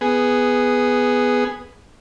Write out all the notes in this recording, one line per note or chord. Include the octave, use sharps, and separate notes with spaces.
B3 G#4